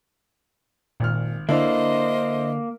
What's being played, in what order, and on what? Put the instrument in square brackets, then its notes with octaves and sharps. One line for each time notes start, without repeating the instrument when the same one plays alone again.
[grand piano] G#1 F6 [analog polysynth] A#2
[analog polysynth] D3 [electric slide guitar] A#3 [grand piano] D4 E4 [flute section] C5 D#5